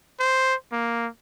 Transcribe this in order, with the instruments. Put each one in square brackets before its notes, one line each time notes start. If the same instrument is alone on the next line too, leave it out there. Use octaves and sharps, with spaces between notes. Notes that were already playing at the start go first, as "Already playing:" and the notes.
[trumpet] C5
A#3